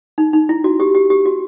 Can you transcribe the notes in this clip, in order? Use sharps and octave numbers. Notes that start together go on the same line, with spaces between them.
D#4
D#4
E4
F#4
G4
G4
G4
F#4